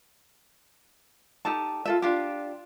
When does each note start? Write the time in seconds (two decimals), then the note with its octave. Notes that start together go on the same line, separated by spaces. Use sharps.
1.45 D#4 G4 A4 A5
1.85 F4 A4 E5
2.02 D4 F4 G4